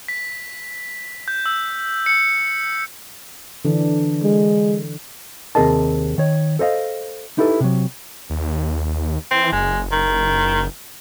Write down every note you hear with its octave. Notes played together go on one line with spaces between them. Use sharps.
B6
G6
E6
C#7
D3 E3 D4
G#3
D#2 C3 G#4 A#4 D#5 A5
D#3 C#5
A4 C5 D#5 F5
D#4 E4 G4 A4 B4
C3 F#3
D#2
E3 C4
F#1 G#3
D#3